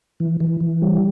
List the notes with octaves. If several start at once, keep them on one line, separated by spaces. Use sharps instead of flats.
E3
E3
E3
G3